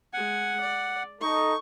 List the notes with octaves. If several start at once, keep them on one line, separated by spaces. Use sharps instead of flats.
G#3 F#5 G#5
D5
D#4 A4 C#6